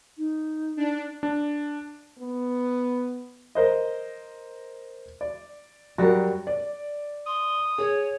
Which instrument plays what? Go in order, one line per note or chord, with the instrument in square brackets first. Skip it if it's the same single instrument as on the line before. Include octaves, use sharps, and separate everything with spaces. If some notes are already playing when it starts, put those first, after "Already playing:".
[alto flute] D#4
[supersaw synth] D4
[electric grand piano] D4
[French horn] B3
[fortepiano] A#4 C5 D#5
D5
[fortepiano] F#2 A#4 [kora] G3 F#4
[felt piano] D5
[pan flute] C6 [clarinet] D#6
[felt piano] G#4 [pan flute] C#5